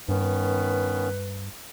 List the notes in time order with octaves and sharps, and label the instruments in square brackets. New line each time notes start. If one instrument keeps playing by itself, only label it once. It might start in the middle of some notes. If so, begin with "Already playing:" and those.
[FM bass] G2 [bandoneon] D#3 B3 C#4 [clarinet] B4